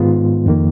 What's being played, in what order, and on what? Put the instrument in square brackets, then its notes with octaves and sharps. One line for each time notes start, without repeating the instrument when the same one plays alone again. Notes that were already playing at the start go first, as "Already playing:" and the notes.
Already playing: [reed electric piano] G#2 D#3 G#3 B3 F4
F2 D#3 A#3